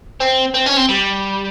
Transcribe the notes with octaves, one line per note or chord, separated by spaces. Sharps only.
C4
C4
C#4
C4
G3